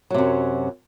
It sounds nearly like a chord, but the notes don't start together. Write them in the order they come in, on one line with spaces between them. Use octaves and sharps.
F#3 C3 F#2